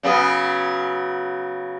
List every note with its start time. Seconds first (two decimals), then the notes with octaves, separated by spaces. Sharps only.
0.03 C#3 F#3 B3